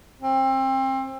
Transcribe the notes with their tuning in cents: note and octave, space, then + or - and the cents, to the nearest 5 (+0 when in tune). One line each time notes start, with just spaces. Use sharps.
C4 +25